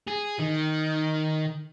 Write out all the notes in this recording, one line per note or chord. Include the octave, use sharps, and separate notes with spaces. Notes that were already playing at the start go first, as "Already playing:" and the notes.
G#4
D#3